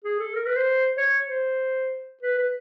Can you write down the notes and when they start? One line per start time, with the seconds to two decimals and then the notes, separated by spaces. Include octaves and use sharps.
0.04 G#4
0.20 A4
0.35 A#4
0.46 B4
0.56 C5
0.98 C#5
1.29 C5
2.23 B4
2.38 B4